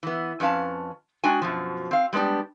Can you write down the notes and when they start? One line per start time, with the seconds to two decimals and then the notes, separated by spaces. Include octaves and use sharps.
0.03 E3 B3
0.40 F2 C#4 B4 F5 A5
1.24 G#3 D4 F#4 G5 G#5
1.42 F#2 B2 F3
1.91 C4 F5
2.13 G3 G#3 B3 D4 G4